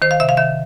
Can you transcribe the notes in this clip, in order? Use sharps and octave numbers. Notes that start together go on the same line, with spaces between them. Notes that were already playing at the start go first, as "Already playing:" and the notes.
D#3 C5
F5
C3 E5
F5
D#3 E5